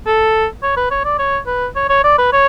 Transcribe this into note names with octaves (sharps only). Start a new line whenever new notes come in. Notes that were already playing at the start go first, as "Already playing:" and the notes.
A4
C#5
B4
C#5
D5
C#5
B4
C#5
C#5
D5
B4
C#5